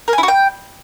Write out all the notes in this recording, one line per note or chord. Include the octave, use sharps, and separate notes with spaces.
A#4
G#5
E4
F#4
G5